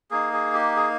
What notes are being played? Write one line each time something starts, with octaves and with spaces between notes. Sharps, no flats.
A#3 D#4 G#4
G#4
G4
G#4